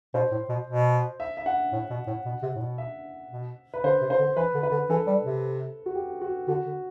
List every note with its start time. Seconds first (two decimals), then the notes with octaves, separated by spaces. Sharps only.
0.14 B2 C5
0.32 A2
0.49 B2
0.67 B2
1.20 E5
1.37 E5
1.46 F#5
1.73 A2
1.90 B2
2.07 A2
2.25 B2
2.43 C3
2.56 A2
2.61 B2
2.78 E5
3.31 B2
3.74 B4
3.84 D3 C5
4.01 C3
4.10 C5
4.19 D3
4.37 E3 B4
4.55 D3
4.63 B4
4.71 D3
4.90 E3 A4
5.07 G3
5.25 C3
5.86 F#4
5.95 G4
6.21 F#4
6.48 D3 F#4
6.66 D3